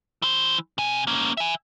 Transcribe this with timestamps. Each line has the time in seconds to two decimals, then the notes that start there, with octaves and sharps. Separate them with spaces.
0.22 E3 C5
0.78 C3 G#5
1.07 A#3 C#4
1.37 E5 G#5